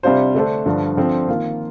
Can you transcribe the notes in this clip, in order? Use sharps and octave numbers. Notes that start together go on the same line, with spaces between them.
C3 G3 D4 F4 C5
D3 A3 D4 A4 C5
G2 D3 F3
D3 F3 C4
D#3 A#3 F4 A#4